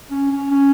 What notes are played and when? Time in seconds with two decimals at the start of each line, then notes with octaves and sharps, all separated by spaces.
0.10 C#4
0.31 C#4
0.50 C#4